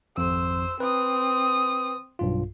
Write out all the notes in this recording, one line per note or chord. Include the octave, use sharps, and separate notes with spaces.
G#1 F2 C5 E6
C4 B4 D#6
B1 G2 F4